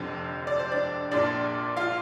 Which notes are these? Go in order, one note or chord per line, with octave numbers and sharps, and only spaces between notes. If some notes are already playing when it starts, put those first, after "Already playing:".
Already playing: F1 F2 D3 C4 C5
D5
C5
D4 D5
A#1 A#2 D4 D5
F4 F5